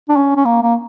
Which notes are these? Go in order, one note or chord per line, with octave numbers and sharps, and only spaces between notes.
D4
C#4
C#4
A#3
A#3